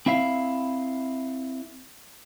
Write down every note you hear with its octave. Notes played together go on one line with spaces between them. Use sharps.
C4 E4 E5 F5